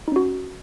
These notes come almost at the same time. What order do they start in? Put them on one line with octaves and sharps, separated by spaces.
D#4 C#4 F#4